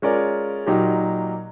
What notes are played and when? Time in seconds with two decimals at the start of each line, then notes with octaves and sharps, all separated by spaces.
0.02 G#3 C#4 F4 A#4 D5
0.66 A#2 F#3 A#3 D#4 G4